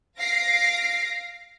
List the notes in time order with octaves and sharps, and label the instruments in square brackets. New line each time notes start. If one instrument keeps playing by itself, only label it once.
[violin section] F5 A#6 C7 D7